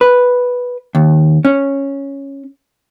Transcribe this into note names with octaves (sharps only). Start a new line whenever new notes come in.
B4
D#2
C#4